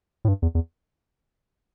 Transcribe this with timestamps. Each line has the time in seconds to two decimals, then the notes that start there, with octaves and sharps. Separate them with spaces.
0.25 A2
0.28 G2
0.42 E2
0.55 E2